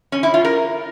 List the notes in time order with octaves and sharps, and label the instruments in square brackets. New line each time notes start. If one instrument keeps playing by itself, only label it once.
[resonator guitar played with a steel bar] C#4
E4
F4
A#4